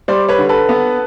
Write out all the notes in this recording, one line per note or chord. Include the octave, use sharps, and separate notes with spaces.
G3 C5 D5
B4 C#5
D3
A4 B4
B3